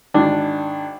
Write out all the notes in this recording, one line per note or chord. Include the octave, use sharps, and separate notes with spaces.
G#1 D4